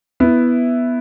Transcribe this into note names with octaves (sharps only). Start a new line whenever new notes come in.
B3 E4